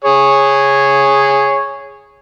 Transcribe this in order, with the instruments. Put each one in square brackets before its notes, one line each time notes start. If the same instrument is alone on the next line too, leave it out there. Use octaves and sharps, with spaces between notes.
[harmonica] G#4 C#5